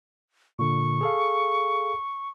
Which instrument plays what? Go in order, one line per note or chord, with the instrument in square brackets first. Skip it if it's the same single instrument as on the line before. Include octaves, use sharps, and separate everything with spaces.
[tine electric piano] A#2 D3 [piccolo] C#6
[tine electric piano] G#4 A4 F5